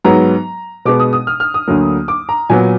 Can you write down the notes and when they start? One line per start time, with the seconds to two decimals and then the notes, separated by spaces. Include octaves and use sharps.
0.05 G#2 F#3 B3 A#5
0.85 B2 G#3 B3 D6
1.00 D#6
1.13 D#6
1.27 F6
1.40 F6
1.54 D#6
1.68 D2 D3 F#3 A#3
2.08 D6
2.29 A#5
2.50 A#2 F#3 B3 G#5